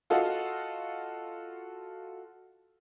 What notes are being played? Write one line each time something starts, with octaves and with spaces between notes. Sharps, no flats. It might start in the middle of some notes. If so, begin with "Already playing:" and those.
F4 F#4 A4 D#5 F5